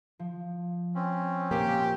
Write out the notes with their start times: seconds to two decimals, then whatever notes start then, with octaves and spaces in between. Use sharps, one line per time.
0.19 F3
0.95 C4 C#4
1.51 A#2 A#3 G4